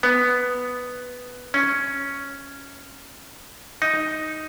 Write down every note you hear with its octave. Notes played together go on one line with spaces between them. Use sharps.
B3
C#4
D#4